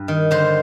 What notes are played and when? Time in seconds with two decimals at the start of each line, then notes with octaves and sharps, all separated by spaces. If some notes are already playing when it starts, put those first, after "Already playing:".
Already playing: G2
0.08 D#3
0.31 D3 C5